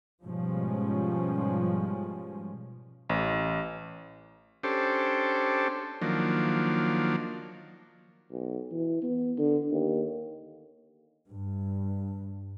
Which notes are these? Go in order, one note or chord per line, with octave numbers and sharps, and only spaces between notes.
G#2 B2 F3 G3 C#4
A1
C#4 D4 G4 A4 C5
D#3 F3 F#3 A#3 D4
B1
E3
B3
D3
D#2
G2